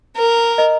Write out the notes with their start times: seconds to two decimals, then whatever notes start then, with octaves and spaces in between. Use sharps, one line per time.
0.16 A#4
0.58 D#5